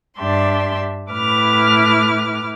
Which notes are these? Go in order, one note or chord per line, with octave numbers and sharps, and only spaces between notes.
G2 D4 G4 D5 E5 C6
A2 E4 B4 D6 F6